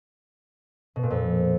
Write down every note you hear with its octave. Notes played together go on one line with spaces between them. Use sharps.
B2
A#2
F2